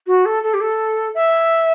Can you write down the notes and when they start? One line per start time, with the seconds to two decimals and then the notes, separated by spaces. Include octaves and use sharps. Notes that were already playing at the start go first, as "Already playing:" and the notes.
0.07 F#4
0.25 A4
0.43 A4
0.54 G4
0.61 A4
1.15 E5